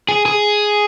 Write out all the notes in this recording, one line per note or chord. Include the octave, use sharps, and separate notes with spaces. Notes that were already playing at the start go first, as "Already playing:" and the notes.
G#4
G#4